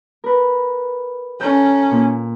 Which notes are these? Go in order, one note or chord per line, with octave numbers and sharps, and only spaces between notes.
A#4 B4
C#4 A4 A#5 G6
A#2